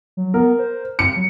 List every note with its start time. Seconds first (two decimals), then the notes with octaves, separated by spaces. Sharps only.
0.17 F#3
0.34 B3 A#4
0.59 C5
0.99 C4 C#7
1.16 F#3